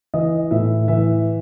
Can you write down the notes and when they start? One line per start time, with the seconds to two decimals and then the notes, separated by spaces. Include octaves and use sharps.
0.14 E3 D#5
0.51 A2 E5
0.88 E3 E5